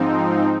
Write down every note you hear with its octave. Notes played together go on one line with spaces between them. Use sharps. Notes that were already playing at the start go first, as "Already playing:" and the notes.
Already playing: G#2 F3 C4 D#4